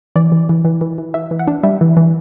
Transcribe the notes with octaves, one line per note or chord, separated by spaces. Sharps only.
E3 D5
E3
E3
E3
E3
E3
E3 E5
E3
F#5
D4
G3 E5
E3
E3